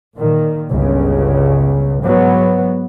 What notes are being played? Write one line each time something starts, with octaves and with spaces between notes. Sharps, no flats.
A#2 D#3
G1 C#2 C#3
G#2 F#3 B3